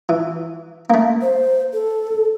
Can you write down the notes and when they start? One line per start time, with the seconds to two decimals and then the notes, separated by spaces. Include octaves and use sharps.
0.09 E3
0.90 A3 A#3
1.22 C5
1.73 A4